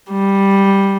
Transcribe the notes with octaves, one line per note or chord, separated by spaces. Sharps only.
G3